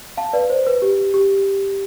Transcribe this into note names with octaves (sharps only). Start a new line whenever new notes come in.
F5 A5
B4 D5
C5
B4
G4
G4